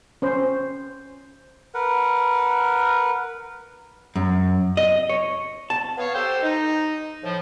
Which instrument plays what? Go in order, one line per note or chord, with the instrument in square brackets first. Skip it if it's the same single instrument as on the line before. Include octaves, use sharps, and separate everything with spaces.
[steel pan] C#4 C5
[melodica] A#4 B4 F#5
[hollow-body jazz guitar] F#2
D#5
C#5
A5
[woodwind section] B3 C#5 F5
G4 A4 C5
D#4
A2 F3